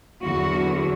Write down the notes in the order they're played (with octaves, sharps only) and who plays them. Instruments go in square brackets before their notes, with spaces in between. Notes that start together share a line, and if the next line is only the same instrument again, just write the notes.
[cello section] E2 D3 F#3 B3 F#4